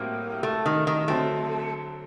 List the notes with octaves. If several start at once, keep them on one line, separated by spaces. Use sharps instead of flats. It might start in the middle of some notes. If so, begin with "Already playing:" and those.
Already playing: A2 G3 A#3 C4 F#4 A#4
A3
D#3
D#3
D3 F#3 A3 C4